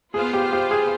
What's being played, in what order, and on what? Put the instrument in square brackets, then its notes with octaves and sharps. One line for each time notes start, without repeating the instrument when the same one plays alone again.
[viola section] B3 F4 C5 F5 [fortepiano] G#4
[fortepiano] G4
G4
G#4